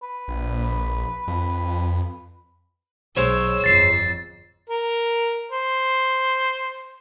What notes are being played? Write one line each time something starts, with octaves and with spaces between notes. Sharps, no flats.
B4
A#1
F2
B1 G#3 C5 C#5 E6
G1 F2 A6 C7
A#4
C5